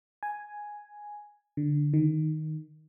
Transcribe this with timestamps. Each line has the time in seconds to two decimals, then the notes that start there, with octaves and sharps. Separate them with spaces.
0.23 G#5
1.57 D3
1.94 D#3